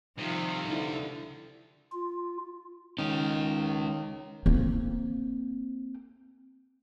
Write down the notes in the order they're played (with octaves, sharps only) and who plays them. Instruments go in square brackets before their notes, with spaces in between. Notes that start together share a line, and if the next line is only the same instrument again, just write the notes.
[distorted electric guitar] C2 C3 [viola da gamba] D#3 F3 F4
[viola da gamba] D3 [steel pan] D#4 E4
[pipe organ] F4
[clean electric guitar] D#3 [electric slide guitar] G#3 C#4
[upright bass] A#3 C4